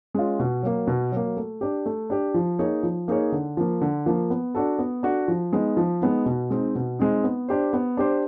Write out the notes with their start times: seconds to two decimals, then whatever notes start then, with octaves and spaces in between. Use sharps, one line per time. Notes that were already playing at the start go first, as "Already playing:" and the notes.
0.14 G#3 C#4 F4
0.39 B2
0.63 F#3 A#3
0.87 B2
1.12 F#3 A#3
1.37 A3
1.61 D4 G4
1.86 A3
2.10 D4 G4
2.34 F3
2.59 A#3 D#4 G#4 C#5
2.83 F3
3.08 A#3 D#4 G#4 C#5
3.32 D3
3.57 F3 A#3
3.81 D3
4.06 F3 A#3
4.30 B3
4.55 D4 F#4 A4
4.79 B3
5.03 D4 F#4 A4
5.28 F3
5.53 G#3 B3 D#4
5.77 F3
6.01 G#3 B3 D#4
6.26 B2
6.50 G#3 C4 D#4
6.75 B2
6.99 G#3 C4 D#4
7.24 B3
7.49 D4 G4 C5
7.73 B3
7.97 D4 G4 C5